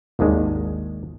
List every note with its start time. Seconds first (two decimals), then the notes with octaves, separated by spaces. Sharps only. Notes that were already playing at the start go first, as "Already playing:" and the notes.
0.19 G#1 D#2 D#3 G#3 D4